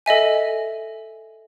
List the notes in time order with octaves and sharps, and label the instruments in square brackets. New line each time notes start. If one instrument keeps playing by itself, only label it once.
[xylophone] A4 D#5 E5 G#5